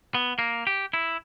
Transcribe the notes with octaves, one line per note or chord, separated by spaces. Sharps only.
B3
A#3
G4
E4